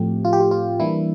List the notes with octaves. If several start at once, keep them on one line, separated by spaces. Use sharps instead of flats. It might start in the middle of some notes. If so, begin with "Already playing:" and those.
Already playing: A2 F3 A3 C4 G4
F4
G4
F4
F4
E3 G3 A#3 D4 E4